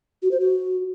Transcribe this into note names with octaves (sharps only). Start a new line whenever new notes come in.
F#4
C5
F#4